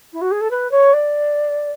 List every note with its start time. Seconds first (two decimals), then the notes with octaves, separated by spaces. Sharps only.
0.13 E4
0.21 F#4
0.31 G#4
0.41 A4
0.51 B4
0.71 C#5
0.93 D5